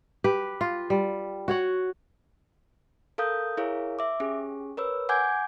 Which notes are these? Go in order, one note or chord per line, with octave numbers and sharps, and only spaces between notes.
G4 B4
F4
G3
F#4 C#5 F#5
A4 A#4 F5 D#6 G6
E4 G#4 A#4 C#5 F5
E5 D6
C#4 G4 G#4
A#4 B4 C#5 E6
F#5 G#5 D6 G6 G#6